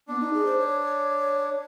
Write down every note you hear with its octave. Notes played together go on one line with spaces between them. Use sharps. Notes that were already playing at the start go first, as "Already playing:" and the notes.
B3 D4
D#4
G#4
C5
C#5